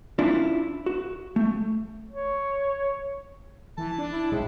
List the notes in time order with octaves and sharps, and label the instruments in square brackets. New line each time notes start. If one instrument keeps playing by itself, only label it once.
[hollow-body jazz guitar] C#4 D4 E4 F4
F#4
A3
[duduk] C#5
[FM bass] E3 [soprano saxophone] A5
[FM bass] D4
[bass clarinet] E4
[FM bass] B1 [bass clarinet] A2 [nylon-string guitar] G#3 E4